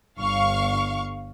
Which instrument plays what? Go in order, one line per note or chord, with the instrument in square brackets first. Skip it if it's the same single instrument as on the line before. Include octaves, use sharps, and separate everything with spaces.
[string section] G1 F5 C#6